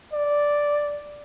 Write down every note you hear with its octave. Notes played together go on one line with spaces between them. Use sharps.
D5